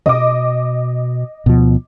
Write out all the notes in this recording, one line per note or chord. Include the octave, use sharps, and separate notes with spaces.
B2 D#5 D6
D2 B2 F3